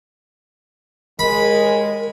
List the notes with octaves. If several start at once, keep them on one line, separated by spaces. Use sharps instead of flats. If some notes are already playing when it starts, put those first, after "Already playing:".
D#2 G#3 A#4 B5